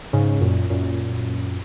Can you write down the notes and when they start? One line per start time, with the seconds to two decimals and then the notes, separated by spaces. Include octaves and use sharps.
0.13 G#2 C#3
0.41 F#2 A#2
0.70 F#2 A#2